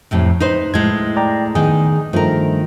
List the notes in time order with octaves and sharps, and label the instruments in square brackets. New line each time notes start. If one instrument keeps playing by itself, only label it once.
[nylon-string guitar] F2 A2 C3
D#4 B4 C5
[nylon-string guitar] A2 G#3 [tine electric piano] G#6
[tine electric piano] D5 G5 A#5
[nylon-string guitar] D#3 B3 D#4 [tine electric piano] G#4
[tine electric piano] G2 F3 A3 [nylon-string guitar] D#3 A#4